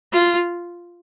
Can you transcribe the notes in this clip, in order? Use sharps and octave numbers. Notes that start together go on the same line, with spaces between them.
F4